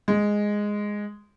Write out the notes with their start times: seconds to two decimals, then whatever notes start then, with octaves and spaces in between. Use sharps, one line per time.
0.08 G#3